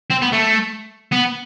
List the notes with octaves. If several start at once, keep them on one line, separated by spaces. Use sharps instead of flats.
C4
B3
A3
B3